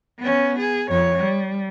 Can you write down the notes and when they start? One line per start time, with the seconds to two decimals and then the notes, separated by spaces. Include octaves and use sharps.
0.19 B3 C#4
0.60 G#4
0.88 F2 C#5
1.20 G3